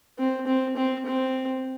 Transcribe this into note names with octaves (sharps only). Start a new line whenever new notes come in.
C4
C4
C4
C4